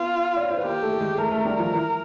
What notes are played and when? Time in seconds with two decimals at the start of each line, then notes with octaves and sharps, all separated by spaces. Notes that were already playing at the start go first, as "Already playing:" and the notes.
Already playing: B3 F4
0.36 D5
0.43 C#5
0.50 C5
0.57 B4
0.64 A#3 G4 A#4
0.82 A3 A4
0.93 A4
1.00 G#3 G#4
1.13 G#4
1.18 A3 A4 A#4
1.31 A3 A4
1.45 G3 G4
1.58 F3 F4
1.72 E3 E4